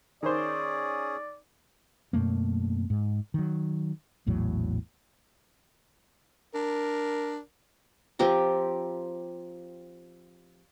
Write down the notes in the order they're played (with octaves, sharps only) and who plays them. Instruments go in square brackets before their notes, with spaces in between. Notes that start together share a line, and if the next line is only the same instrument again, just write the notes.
[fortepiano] D#3 C5 [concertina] C#4 G#4 [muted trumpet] D5
[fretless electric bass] F#2 B2 A3 A#3
G#2
D#3 F#3
A#1 E2 A2 F#3
[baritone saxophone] D4 [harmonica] A#4
[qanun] F3 C4 G4 A#5